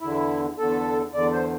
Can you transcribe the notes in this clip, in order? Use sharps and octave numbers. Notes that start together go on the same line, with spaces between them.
E2 D3 E4
E2 D3 A4
E2 D3 D5
C5